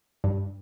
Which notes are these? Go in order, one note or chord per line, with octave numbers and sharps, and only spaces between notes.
G2